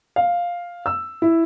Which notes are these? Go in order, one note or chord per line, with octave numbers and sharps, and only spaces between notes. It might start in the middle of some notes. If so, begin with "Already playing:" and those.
F5
E6
E4